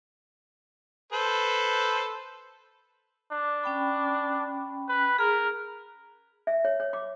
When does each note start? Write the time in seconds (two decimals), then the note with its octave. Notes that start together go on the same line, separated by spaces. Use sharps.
1.12 A4 B4 C5
3.31 D4
3.64 C#4 G5 B5
4.88 B4
5.18 G#4 A#4
6.47 E5
6.65 C#5
6.80 C#5
6.93 D6